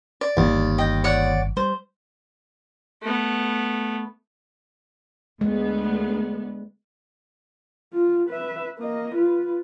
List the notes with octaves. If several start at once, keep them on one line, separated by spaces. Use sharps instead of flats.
D5
G1 D#2 D#3
D#5 G5
C#5 D5 F#5
G3 C5
A3 B3
D2 G#3 B3
F4
B4 E5
A#3 D#5
F4 B4